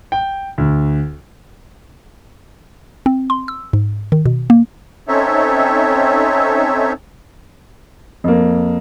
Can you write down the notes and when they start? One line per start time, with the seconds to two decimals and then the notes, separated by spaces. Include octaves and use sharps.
0.12 G5
0.58 D2
3.06 C4
3.30 C6
3.48 E6
3.73 G#2
4.12 D#3
4.26 B2
4.50 A#3
5.08 C4 C#4 D#4 A4 C#5 E5
8.24 F2 A#3